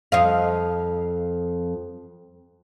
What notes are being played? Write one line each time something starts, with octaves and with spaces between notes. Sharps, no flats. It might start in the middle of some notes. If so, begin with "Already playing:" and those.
F2 D#5 F5